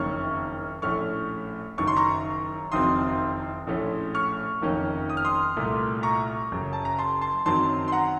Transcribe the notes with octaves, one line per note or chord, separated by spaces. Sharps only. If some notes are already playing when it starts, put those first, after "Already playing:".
Already playing: F#1 F2 D#3 A#3 C#4 C#6 F6
A#1 A2 A3 C#4 C#6 F6
F#1 F#2 D#3 C#6
C6
A#5 C#6
F#1 F2 D#3 F#3 C4 C6 D#6
A#1 A2 A3 C#4
C#6 F6
F#1 F2 D#3 A#3 C#4
D#6
F6
C6 D#6
C2 A#2 A3
A#5 C#6
F#1 F#2 C#3
A5
A#5
A5 C6
A5 C6
F#2 D#3 F#3 C4 A5 C6
C6
F#5 A#5